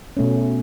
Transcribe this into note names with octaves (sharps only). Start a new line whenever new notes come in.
B2 A3 C#4